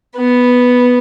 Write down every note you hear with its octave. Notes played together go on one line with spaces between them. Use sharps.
B3